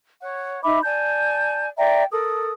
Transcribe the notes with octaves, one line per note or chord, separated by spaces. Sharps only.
C#5 F#5
D#4 E5 B5 D6
D5 G#5 A5 G6
D5 E5 G5 A#5
A4 A#4 D#6